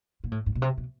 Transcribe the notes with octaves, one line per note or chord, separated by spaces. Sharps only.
A#2
A2
G#2
B2
C3
B2